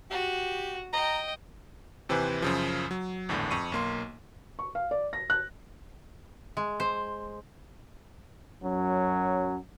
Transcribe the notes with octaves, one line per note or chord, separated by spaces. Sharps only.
F#4 G4
D#5 G5 A#5
D#2 C3 E3 B4 C5 G#5
F#2 C#3 F3
F#3
G#1 E2 A2 D3
F2 C#6 D#7
B1 A#3 C6
C#6
F5
D5
A#6
F#6
G#3
C5
F#2 F#3 C#4